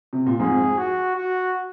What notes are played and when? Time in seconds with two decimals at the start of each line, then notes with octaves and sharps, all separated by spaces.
0.13 C3
0.27 A#2
0.40 F2 G#2 G#4
0.78 F#4
1.16 F#4